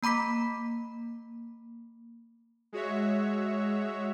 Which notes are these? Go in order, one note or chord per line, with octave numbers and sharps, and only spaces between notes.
A#3 A#5 B5 D6 B6
G#3 F#4 C#5 E5